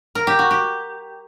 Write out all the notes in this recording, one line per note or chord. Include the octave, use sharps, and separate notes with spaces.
A#4
G4
F#4
G4